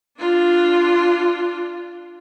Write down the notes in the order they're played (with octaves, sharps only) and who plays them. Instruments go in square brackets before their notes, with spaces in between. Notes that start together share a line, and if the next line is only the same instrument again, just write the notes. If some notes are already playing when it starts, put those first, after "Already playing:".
[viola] D4 F4